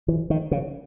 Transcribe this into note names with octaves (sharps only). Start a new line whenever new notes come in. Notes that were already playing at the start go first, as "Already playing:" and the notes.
E3
D#3
C#3